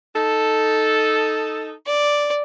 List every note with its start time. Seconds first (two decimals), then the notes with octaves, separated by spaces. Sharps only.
0.15 D#4 A4
1.86 D5